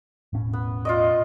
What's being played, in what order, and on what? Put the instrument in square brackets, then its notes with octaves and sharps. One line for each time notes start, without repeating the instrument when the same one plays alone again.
[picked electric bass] E1 A2 C#4
[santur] B3
F4 D5 D#5